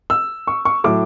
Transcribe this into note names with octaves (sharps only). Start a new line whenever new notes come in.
E6
C#6
C#6
A2 F#3 D6